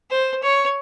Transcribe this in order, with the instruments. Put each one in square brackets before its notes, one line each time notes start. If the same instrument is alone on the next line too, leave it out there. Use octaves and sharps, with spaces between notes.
[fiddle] C5
C#5